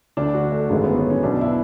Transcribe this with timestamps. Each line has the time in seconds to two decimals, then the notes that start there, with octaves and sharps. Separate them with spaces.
0.17 D2 D3 D4
0.34 F#4
0.52 A3
0.69 G#1 F#2 D3 G#3
0.84 B3
0.97 C#4
1.10 C#4
1.23 B1 B2 D4
1.41 E4